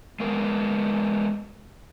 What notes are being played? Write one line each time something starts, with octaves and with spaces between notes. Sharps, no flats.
G#3 B3 A#4